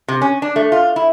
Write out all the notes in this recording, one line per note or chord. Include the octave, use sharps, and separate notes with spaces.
C3
C#4
D4
A3
F4
E4